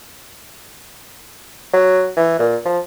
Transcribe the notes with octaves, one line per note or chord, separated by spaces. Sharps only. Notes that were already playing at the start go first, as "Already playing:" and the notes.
F#3
E3
A#2
F3